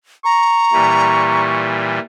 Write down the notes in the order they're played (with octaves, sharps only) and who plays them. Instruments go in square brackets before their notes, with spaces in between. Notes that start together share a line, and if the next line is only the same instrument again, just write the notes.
[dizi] A#5 [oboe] C#6
[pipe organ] A#2 E3 G3